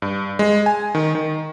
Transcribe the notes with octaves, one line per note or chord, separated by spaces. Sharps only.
G2
G#3
G#5
D#3
D#3